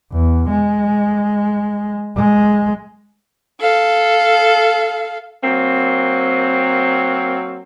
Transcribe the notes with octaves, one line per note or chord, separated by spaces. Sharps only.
E2
G#3
G#3
A4 F5
F#3 A#3 C4